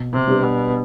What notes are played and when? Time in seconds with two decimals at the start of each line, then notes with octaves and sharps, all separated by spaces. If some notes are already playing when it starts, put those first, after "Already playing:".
Already playing: B2
0.13 C3
0.28 G3 B3 D4 G4
0.43 B2